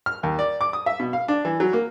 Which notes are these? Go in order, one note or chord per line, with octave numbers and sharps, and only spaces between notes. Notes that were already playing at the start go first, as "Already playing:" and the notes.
F6
D#2
D5
D6
D#6
E5
B2
F5
D4
E3
F#3
A#3